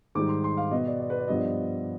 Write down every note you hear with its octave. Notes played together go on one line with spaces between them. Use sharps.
G#2 D#3 G3 D6
C6
C6
F5
B2 B3 D#5
D5
D5
B4
D5
G2 F3 B3 D#5
D5